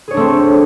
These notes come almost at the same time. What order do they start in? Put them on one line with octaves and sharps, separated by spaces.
G#4 C#5 D4 A3 C4